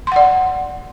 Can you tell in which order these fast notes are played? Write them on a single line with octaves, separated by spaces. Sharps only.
C6 F#5 D5